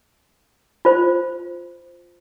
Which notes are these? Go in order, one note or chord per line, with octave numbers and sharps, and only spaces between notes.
F4 C5